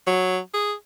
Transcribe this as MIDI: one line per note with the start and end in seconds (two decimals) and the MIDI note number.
0.07 0.38 54
0.54 0.73 68